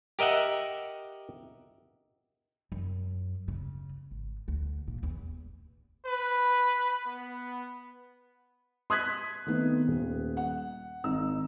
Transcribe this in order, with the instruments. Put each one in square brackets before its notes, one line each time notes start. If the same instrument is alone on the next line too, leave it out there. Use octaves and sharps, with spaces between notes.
[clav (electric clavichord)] G4 A#4 D#5 E5 F#5
[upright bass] F#2
C#3
G#1
D2
A#2
E2
[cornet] B4
B3
[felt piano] C6 D#6 F#6 G#6 B6
D#3 A3 B3 C4
D#1
F#5
G#1 D#4 E6